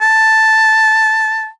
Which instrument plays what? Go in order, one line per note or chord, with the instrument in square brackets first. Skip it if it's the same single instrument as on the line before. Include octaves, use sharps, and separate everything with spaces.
[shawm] A5